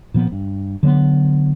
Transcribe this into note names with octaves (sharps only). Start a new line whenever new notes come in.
A#2 F3 B3
G2
D3 F#3 A3 B3